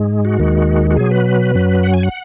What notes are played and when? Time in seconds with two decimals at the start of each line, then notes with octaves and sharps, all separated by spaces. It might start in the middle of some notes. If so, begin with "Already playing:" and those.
Already playing: G#2 G#3
0.25 F#4
0.39 D#2 D#3 G#3
0.91 F#4
0.97 B2 F#3 G#4
1.11 B4
1.55 F#2 F#3
1.83 F#5
1.94 G#5
2.03 F#5